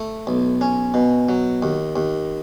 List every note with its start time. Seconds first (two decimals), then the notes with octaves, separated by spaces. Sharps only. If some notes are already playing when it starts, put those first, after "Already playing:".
Already playing: A3
0.27 B1
0.61 C#4
0.94 B2
1.29 F#3
1.63 D#2
1.96 D#2